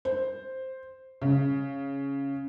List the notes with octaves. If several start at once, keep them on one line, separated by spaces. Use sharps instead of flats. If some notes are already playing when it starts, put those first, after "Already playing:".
C5
C#3